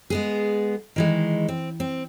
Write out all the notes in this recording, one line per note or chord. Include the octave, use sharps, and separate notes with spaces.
G#3 B3 G#4
D#3 E3 G#3
C4
C4